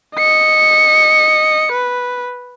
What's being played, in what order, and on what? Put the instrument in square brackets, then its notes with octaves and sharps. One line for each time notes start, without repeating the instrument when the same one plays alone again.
[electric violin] D#5 C#7
B4